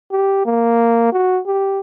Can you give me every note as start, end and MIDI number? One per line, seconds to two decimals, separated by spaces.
0.12 0.45 67
0.45 1.08 58
1.12 1.40 66
1.46 1.80 67